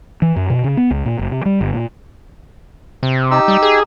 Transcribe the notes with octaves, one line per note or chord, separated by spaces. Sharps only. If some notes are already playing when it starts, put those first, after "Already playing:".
E3
F#2
B2
C#3
B3
C#2
A#2
F#1
C3
G3
G1
A#2
C3
D#4 G4 E6
G3
G#4